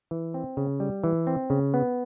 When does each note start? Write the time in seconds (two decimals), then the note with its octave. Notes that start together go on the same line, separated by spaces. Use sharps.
0.11 E3
0.34 C4
0.57 C#3
0.80 G3
1.04 E3
1.27 C4
1.50 C#3
1.74 B3